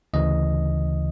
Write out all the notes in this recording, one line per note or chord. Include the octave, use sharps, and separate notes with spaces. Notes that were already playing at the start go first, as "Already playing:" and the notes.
D2 C#3 E3 D#5